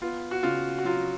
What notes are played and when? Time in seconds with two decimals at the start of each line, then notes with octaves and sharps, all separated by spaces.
0.02 B3 F4
0.31 F#4
0.43 C#3 F4
0.78 F#4
0.85 F#3 F4